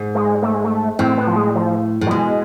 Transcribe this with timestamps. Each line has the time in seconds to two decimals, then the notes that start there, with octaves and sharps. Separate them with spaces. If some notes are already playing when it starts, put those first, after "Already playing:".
Already playing: G#2
0.15 G#3
0.42 A3
0.54 G#3
0.65 A3
0.99 A2 C4
1.18 B3
1.27 F3
1.36 G#3
1.55 F3
2.01 A2
2.06 F3
2.11 B2 G#3